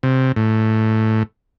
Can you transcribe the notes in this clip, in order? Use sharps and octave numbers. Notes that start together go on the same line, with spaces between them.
C3
A2